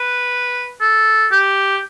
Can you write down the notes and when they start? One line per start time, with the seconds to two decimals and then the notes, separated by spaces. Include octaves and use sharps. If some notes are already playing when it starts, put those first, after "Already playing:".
Already playing: B4
0.81 A4
1.32 G4